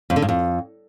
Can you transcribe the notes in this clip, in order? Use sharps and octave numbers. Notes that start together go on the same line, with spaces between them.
F2
D3
G2
F2